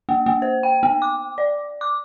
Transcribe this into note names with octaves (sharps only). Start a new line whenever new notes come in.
A#3
A#3
C5
G5
B3
D6
D5
D6